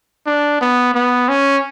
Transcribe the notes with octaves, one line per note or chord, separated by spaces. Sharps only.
D4
B3
B3
C#4